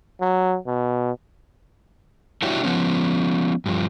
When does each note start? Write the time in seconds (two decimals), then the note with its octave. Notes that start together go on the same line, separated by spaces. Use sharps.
0.21 F#3
0.67 B2
2.42 D4 E4 F#4 G4 C#5 E5
2.63 F3 B3 C#4
3.66 G2 F3